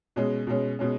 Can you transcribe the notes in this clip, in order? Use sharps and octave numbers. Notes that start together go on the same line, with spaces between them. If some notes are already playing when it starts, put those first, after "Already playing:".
B2 G#3 C#4
B2 G#3 C#4
B2 G#3 C#4